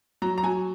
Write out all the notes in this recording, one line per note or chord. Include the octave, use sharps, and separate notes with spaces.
F#3 A#5
A#5
F#3 G#5